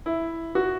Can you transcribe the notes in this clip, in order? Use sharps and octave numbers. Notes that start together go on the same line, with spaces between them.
E4
F#4